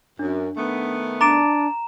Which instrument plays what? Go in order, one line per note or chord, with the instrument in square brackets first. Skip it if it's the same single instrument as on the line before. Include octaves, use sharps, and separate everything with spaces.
[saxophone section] F#2 [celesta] D4
[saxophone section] D#3 A3 B3
[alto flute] D4 [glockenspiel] A#5 E7 [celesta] D6 A6 D7